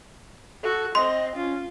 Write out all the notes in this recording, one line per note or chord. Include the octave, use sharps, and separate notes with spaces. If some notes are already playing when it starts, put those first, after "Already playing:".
F#4 A4
C4 D#5 C6
C#4 F4